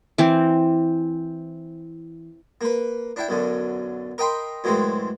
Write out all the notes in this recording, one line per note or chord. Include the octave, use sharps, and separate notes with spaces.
E3 C4
A#3 B4
D4 E4 G5
B1 F#2 D3
A#4 D#5 G5 B5 C6
F#2 A2 E3 G#3 C4